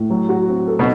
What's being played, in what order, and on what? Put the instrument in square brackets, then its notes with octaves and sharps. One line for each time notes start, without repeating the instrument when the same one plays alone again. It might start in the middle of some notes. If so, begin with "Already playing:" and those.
Already playing: [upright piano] A2
F#3
F#4
C4
A4
[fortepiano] B2